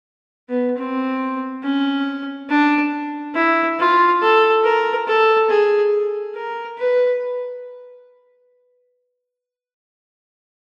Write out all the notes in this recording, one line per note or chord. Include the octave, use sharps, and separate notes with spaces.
B3
C4
C#4
D4
E4
F4
A4
A#4
A4
G#4
A#4
B4